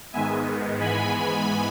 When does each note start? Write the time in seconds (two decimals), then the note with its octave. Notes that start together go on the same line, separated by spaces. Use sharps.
0.13 G#2 D#3 G#3 B3 E5 G#5
0.79 G#2 E3 G#3 B3 G#5 B5
1.12 G#5 B5